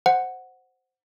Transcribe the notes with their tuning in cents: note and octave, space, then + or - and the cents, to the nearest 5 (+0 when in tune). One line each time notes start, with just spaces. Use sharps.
C5 +0 F#5 +0